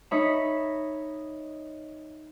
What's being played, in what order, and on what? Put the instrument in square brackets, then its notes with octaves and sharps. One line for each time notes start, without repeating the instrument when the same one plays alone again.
[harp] D#4 C#5 E5 B5